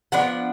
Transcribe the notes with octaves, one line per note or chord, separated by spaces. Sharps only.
F3 B3 D4 F#5